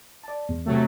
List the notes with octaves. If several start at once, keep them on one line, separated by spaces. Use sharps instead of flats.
D5 A5
E2
C3 F#3 A3